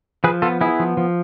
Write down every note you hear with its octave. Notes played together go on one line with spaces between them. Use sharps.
F3 G#4 B4
B3 F4 A4
B3 E4 G#4
F3
F3